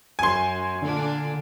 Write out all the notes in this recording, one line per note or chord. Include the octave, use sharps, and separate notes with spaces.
F#2 G#5 C6
A#2 D3 D4 F4